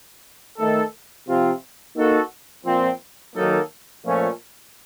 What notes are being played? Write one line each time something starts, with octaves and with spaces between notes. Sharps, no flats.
D#3 A3 D#4 A4
C3 F3 C4 F4
A#3 D#4 F#4 A4
A#2 F3 C4
D#3 F#3 A#3 D#4 A4
A#2 F3 A3 C#4